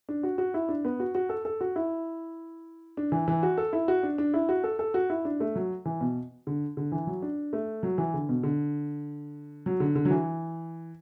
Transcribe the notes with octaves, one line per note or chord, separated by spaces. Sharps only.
D4
F#4
F#4
E4
D4
B3
F#4
F#4
A4
A4
F#4
E4
D4
E3
E3
F#4
A4
E4
F#4
D4
D4
E4
F#4
A4
A4
F#4
E4
D4
A3
F#3
E3
B2
D3
D3
E3
F#3
D4
A3
F#3
E3
D3
B2
D3
F#3
D3
D3
F#3
E3